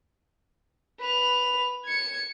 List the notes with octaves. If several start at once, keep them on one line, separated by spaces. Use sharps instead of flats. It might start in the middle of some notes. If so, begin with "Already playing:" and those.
B4 F7
G#6 C#7